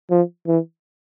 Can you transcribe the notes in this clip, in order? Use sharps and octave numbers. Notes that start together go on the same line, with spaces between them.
F3
E3